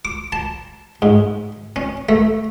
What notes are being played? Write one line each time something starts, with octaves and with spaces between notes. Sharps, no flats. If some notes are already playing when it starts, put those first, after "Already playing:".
D6
A5
G#2
C#4
A3